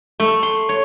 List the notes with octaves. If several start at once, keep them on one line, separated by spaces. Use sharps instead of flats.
A3
C6
C#5